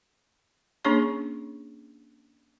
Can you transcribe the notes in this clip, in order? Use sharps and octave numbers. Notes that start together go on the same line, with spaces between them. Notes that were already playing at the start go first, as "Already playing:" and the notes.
A#3 C#4 D4 G#4 C#5 C#6